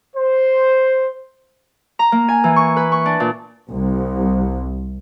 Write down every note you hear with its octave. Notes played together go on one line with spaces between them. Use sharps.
C5
A#5
A#3
G#5
E3
C#6
B4
C#6
D4
A#2
C2